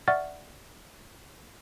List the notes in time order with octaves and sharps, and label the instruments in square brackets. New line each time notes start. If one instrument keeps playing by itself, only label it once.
[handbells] D5 E5 F#5 C#6 F6 A6